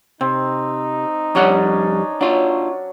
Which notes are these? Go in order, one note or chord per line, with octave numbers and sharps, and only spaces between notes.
C3 C4 D#4
F2 G3 C#4 D4 F#5
F#3 D4 F4